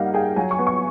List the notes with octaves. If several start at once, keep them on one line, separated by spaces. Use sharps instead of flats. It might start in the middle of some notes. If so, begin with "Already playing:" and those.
Already playing: G3 A#3 D#4 F5 F#5
G#4 G5
F#3 G#5
C#6
B3
C#6